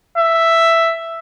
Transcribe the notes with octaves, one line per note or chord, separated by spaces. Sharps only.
E5